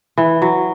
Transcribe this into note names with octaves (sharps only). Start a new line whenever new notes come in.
E3
F#3